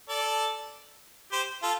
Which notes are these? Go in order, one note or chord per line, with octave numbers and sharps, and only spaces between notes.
A4 D5
G4 C5
F4 A4